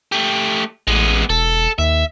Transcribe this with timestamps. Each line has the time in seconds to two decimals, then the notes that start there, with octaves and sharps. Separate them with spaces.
0.12 A3 G4
0.87 A1 G#3 B3
1.30 E1 A4
1.79 D#2 E5